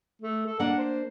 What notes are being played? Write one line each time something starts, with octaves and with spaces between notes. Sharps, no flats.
A3
A4
A#3 D4 F#5
C5